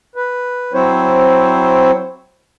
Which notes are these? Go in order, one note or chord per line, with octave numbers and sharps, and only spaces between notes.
B4
F#3 C4 E4 C5 C#5